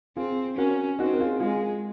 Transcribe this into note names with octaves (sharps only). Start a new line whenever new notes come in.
C4 F4 G#4
C#4 F#4 A#4
C4 D#4 F#4
A#4
F4 G#4
G#3 F4 G#4